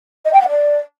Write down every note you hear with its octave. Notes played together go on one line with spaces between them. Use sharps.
D#5
G5
F#5
D5